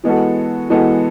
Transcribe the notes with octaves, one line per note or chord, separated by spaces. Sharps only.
E3 G#3 B3 F#4 A4
E3 G#3 B3 F#4 A4